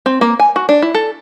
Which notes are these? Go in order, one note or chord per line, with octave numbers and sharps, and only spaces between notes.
C4
A#3
G#5
F#4
D4
E4
A4